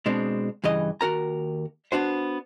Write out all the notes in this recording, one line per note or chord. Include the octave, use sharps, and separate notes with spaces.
B2 G#3 C4 D4
G2 C#3 E3 D#5
D#2 F#4 A#4 A#5
B3 D4 F#4 C5